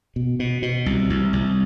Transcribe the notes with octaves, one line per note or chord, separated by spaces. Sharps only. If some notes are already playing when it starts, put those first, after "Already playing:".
B2
B2
B2
C2
C2
C2